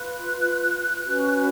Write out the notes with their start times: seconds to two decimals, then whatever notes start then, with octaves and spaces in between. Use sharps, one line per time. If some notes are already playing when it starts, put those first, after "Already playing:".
Already playing: F4 B4 F#6
1.03 C#4 F#4 B4